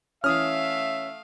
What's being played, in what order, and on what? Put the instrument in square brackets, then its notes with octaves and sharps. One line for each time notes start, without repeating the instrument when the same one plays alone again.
[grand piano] E3 C#4 [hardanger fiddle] A3 F5 [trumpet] E5 [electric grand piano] D#6 F6